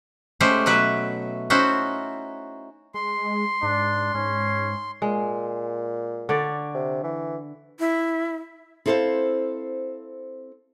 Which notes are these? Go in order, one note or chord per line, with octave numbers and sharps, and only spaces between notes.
G#3 A3 C#4 G4 C5
B2 F#3 B4 E5
C#4 D#4 E4 F#4 C5
G#3 C6
G#2 D4
G#2 C#4
A#2 G#3
D3 C#5 D5
C3
E3
E4
C4 E4 A4 C5 C#5 F5